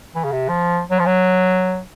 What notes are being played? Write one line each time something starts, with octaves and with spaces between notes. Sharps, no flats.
E3
C#3
C3
F3
F#3
F3
F#3